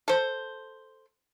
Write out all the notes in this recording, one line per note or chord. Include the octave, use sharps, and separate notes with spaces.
A4 C5